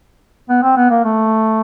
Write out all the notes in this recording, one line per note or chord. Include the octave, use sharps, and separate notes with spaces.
B3
C4
B3
A#3
A3